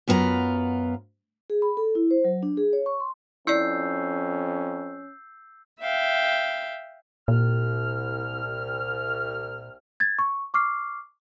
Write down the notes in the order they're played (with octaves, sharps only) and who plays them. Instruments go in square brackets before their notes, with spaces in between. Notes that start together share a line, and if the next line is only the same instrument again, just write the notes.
[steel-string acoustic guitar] F#2 B3 E4 F4 A#5
[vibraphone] G#4
B5
A4
E4
C5
F#3
D4
G#4
C#5
C#6
C6
[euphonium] F2 [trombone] C#4 [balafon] E4 D5 [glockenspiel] E6 G6 C7
[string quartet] E5 F5 G5
[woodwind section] C2 F6 [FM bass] A#2
[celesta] G#6 A6
C#6
C#6 D6 F6 C7